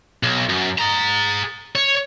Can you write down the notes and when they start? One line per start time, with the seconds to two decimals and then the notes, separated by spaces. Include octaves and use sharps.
0.23 B1
0.49 F#2
0.79 G#4 A#5
1.75 C#5